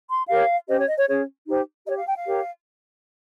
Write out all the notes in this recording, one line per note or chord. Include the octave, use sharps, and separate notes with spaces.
C6
G4 A#4 C#5 F5
C#4 G4 C5 D#5
C#5
D#5
C#5
C#4 G#4 C#5
D#4 G4 C5
G4 C#5 D#5
F5
G5
F5
G4 A#4 C#5